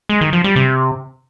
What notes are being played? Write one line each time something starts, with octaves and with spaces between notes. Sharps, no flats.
G#3
D#3
F3
G3
C3